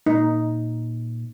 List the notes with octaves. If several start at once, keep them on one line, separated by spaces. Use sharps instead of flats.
A#2 D#4